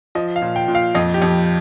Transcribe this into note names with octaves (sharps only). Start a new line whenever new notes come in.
F3 D#5
F5
A#2
G5
A#2
F5
F2 D#5
G4
F2